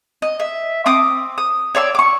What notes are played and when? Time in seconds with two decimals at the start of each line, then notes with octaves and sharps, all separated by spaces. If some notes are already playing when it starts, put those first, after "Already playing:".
0.22 D#5
0.40 E5
0.86 C4 D6 D#6
1.38 D#6
1.75 C#5 D5 C6 E6
1.95 C#6 D6